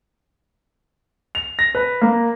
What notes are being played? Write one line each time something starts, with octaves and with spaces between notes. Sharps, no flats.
F7
A#6
B4
A#3